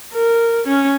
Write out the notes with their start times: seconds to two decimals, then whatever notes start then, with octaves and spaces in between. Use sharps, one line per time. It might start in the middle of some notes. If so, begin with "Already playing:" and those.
0.14 A#4
0.68 C#4